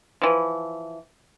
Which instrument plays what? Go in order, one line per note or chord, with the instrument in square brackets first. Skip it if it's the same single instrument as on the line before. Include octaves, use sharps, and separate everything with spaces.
[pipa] E3 F3